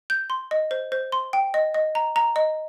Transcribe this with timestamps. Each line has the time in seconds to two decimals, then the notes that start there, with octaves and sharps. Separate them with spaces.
0.10 G6
0.30 C6
0.51 D#5
0.71 C5
0.92 C5
1.12 C6
1.33 G5
1.54 D#5
1.74 D#5
1.95 A#5
2.16 A#5
2.36 D#5